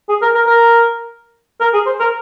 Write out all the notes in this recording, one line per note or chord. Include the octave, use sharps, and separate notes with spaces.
G#4
A#4
A#4
A#4
A#4
G#4
C5
A#4